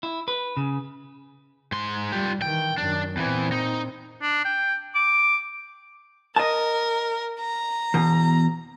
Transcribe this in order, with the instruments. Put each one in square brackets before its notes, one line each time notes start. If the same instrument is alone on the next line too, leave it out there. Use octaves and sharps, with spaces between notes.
[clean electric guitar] E4
B4
C#3
[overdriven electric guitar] G#2 C6
[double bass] G3 [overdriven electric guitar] F4 G4
[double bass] D#3 E3 [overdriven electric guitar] G5
[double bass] F#2 D#3 [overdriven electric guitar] D4
[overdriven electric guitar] E2 E3 [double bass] A#2 C4
[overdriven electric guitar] D#4
[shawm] D4
G5
D6
[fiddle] A#4 [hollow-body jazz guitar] D#5 A5
[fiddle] A#5
[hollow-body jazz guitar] E2 B2